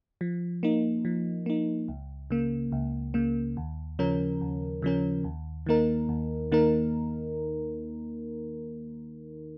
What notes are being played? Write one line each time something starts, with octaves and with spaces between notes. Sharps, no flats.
F3
A#3 D#4
F3
A#3 D#4
C#2
C#3 A#3
C#2
C#3 A#3
D#2
C#3 F3 C#4 A#4
D#2
C#3 F3 C#4 A#4
D#2
D#3 A#3 D#4 A#4
D#2
D#3 A#3 D#4 A#4